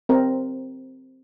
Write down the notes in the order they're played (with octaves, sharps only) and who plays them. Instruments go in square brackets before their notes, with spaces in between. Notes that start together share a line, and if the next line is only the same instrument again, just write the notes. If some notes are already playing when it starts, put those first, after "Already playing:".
[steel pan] C4 A#4